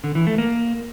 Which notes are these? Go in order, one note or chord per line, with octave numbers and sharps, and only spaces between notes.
D3
E3
A3
A#3